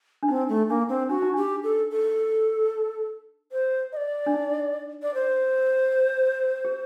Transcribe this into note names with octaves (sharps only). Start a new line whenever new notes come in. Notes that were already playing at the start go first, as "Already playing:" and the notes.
D4
C4 D#4
A3
A#3 D4
C4
D4 F#4
D#4
D4 G4
A4
A4
C5
D#5
D5
D4
D#4
D5
C5
G4